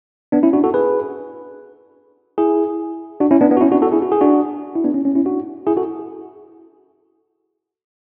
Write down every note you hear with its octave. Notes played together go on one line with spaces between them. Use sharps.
B3 D4
C#4 E4
D4 F#4
F#4 A4
G#4 B4
E4 G#4
D4 F#4
C#4 E4
B3 D4
B3 D4
F#4
C#4 E4
D4 F#4
F#4 A4
E4 G#4
F#4
G#4
D4 F#4
E4
B3 D4
C#4
C#4
C#4 E4
D4 F#4
E4 G#4
F#4 A4